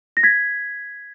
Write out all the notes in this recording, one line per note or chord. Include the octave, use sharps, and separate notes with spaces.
A#6
G#6 B6